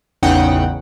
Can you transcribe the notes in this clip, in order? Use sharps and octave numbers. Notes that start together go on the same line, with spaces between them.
A1 E2 C#3 D#4 F#5 G5